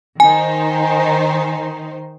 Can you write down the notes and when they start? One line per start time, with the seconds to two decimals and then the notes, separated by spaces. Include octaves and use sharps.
0.20 D#3 D#4 C5 G#5